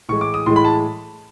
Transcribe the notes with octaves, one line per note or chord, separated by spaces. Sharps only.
A2 E3 G#3 C#6
D6
D#6
A2 E3 G#3 C6
B5
A5